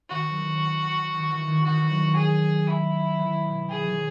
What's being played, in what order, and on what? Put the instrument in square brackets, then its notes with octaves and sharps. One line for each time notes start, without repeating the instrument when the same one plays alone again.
[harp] D#3 [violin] F#4
[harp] F#3
E3
D#3
E3
D#3
[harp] D#3 [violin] F#4
[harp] E3
F#3
[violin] G#4
E4
[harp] E3
B2
[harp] D#3 [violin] G#4
[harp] E3 F#3